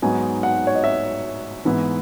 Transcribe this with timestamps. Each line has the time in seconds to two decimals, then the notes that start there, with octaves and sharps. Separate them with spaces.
0.02 G#2 F#3 B3 D#4 G#5
0.43 F#5
0.67 C#5
0.75 D#5
0.84 E5
1.65 G#2 E3 B3 E4